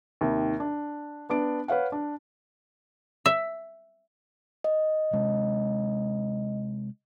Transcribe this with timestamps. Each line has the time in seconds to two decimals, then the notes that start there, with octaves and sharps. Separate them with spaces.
0.21 D#2 C3 D#3
0.60 D4
1.29 B3 D4 D7
1.68 B4 C#5 F5 F#5
1.92 D4
3.26 E5
4.64 D#5
5.13 C3 G#3